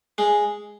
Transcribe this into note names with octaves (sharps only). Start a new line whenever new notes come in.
G#3